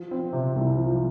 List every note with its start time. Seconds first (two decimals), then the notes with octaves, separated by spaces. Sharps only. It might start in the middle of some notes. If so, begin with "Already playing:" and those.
Already playing: F3
0.11 C4
0.33 C3
0.56 C2
0.77 F3